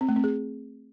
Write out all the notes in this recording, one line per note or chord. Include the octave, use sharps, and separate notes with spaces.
C4
A3
C4
G#4